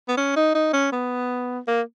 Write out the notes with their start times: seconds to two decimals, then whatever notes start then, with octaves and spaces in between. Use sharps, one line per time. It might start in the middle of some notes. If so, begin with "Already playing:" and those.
0.08 B3
0.17 C#4
0.36 D#4
0.55 D#4
0.73 C#4
0.92 B3
1.67 A#3